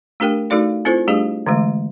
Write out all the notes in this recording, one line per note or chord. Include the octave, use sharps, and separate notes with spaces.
A3 D4 G4 A#4 G5
A3 D#4 F#4 A4 D5 F5
C4 E4 F4 A4 C5
G3 A3 D4 G4 G#4
D3 E3 G#3 A3